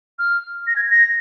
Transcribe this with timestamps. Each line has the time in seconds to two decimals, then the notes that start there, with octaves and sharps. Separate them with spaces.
0.19 F6
0.67 A#6
0.76 G#6
0.90 A#6